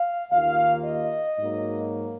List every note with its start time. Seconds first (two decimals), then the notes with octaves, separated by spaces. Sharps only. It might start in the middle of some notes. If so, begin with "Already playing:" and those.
Already playing: F5
0.32 D#2 D#3 A#3 F4 F5
0.86 D#5
1.39 G#2 F#3 A#3